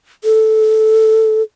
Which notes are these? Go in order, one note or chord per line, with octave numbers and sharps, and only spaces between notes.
A4